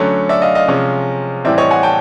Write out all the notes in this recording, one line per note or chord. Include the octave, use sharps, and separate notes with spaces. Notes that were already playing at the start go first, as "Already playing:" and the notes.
Already playing: D3 F#3 A3 C#4
D5 E5
D#5 F5
D#5 F5
C3 F3 G#3 C#4
A2 E3 G3 C4 D5 E5
C#5 D#5
F#5 G#5
G5 A5